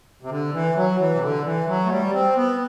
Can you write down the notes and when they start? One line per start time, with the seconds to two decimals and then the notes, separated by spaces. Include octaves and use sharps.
0.23 C3
0.30 D3
0.53 E3
0.76 F#3
0.99 E3
1.14 C3
1.22 D3
1.45 E3
1.67 F#3
1.85 A3
1.90 G3
2.13 C4
2.36 B3